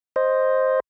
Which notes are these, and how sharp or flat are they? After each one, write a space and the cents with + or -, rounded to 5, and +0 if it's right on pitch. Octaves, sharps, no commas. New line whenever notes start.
C5 +5 D#5 +0